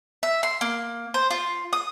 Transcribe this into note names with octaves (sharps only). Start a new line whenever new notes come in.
E5
C6
A#3
C5
F4
D#6